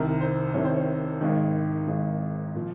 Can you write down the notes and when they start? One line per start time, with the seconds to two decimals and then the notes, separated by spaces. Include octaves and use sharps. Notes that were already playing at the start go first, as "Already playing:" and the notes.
Already playing: C2 C3 D#3 A#4
0.21 C5
0.54 C2 C3 D#3 C#5
0.65 C5
0.76 C#5
1.21 G#1 G#2 D#3
1.87 G#1 G#2 D#3
2.55 A#2 F3